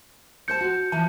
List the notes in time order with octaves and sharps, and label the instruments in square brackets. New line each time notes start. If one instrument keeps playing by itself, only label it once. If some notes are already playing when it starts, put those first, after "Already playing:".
[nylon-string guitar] G3 C5 A5 [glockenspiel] G6 C#7
[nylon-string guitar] F#4
[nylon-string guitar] E3 F3 [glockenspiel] A5